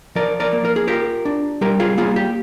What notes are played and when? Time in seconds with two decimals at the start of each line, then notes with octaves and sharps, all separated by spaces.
0.15 F3 A#4 D5
0.40 A#4 D5
0.53 A#3
0.65 A#4
0.76 G#4
0.87 F4 G4 A#4
1.25 D4
1.61 G3 G4 A#4
1.80 F4 G#4
1.98 A#3 F4 G#4
2.16 G4